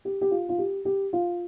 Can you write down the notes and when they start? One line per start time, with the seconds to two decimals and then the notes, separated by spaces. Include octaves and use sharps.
0.05 G4
0.21 G4
0.31 F4
0.49 F4
0.58 G4
0.85 G4
1.13 F4